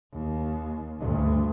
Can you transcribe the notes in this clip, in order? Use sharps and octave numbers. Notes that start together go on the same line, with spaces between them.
D#2
D2 G2